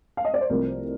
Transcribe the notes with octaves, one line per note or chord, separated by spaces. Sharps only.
F5
D#5
D5
C5
C2 C3 F3 A3 C4 A#4